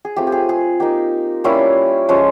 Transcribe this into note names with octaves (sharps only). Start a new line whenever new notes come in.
G#4
A3 C4 F4 G4
G4
G#4
G#4
A#3 D#4 G4
G3 A#3 C#4 E4 F4
F3 G#3 C#4